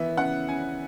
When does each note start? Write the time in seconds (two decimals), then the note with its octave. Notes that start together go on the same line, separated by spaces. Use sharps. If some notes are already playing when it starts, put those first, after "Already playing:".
Already playing: E3 B3 E5
0.17 C#3 F#5
0.49 C#3 G#5